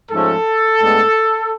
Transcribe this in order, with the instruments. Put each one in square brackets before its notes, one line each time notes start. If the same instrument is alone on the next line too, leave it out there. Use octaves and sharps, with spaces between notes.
[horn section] G#2 F3 A3 C#4 A4
A2 G#3 B3 D4